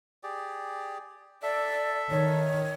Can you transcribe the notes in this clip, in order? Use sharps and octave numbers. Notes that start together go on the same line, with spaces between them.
G4 G#4 D5
A4 D5 E5
D#3 C#5